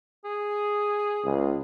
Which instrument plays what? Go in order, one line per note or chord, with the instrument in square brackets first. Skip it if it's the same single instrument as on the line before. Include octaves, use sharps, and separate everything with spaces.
[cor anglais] G#4
[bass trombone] C#2